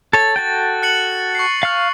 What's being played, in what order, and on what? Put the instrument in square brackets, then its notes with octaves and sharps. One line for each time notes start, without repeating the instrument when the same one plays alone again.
[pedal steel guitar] A4 C#5 [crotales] A6
[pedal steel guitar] F#4 A4 G5
[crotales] F#6 C#7 F#7
C#6 C7
[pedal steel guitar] F5 F6